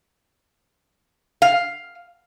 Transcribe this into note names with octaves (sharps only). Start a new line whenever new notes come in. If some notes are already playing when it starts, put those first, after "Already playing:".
F5